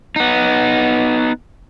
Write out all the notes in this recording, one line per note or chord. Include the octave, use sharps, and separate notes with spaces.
B3 D#4